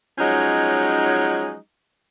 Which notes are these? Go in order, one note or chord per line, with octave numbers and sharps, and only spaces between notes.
F3 F#3 G#3 C#4 D#4